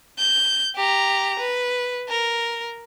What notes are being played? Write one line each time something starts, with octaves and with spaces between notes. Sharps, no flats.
G6
G4 A#5
B4
A#4